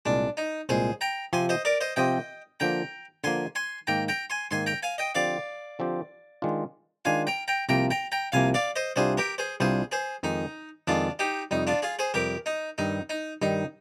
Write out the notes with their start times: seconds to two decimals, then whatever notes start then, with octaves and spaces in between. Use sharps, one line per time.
0.05 C2 A#2 G#3 D4
0.37 D#4
0.69 C2 A#2 G#3 G#4 C5
1.01 G5 A#5
1.33 C3 F3 C4 G4 G#5 C6
1.49 C5 D#5
1.65 A#4 D5
1.81 C5 D#5
1.96 C3 F3 C4 G4 D#5 G5
2.60 D3 F3 A#3 G5 A#5
3.24 D3 F3 A#3 G#5 C6
3.55 G#5 C6
3.87 G#2 D#3 A#3 G5 A#5
4.08 G5 A#5
4.30 G#5 C6
4.51 G#2 D#3 A#3 G#5 C6
4.66 G5 A#5
4.83 F5 G#5
4.98 D#5 G5
5.15 D3 F3 C4 G4 D5 F5
5.79 D3 F3 C4 G4
6.42 D#3 G#3 D4 F4
7.05 D#3 G#3 D4 F4 F5 G#5
7.27 G5 A#5
7.48 G5 A#5
7.69 C2 C3 F3 A#3 G5 A#5
7.91 G5 A#5
8.12 G5 A#5
8.32 C2 C3 F3 A#3 F5 G#5
8.54 D5 F5
8.76 C5 D#5
8.96 C2 C3 G3 D4 F4 G#4 C5
9.17 G4 A#4
9.38 G#4 C5
9.60 C2 C3 G3 D4 F4 G#4 C5
9.92 G#4 C5
10.23 F2 D#3 G#3 D#4
10.87 F2 D#3 G#3 D4 F4
11.19 D#4 G4
11.51 F2 C3 G3 D#4
11.67 D4 F4
11.82 F4 G#4
11.99 G#4 C5
12.14 F2 C3 G3 G4 A#4
12.46 D#4
12.78 G2 D#3 G3 D#4
13.10 D#4
13.42 G2 D#3 G3 D#4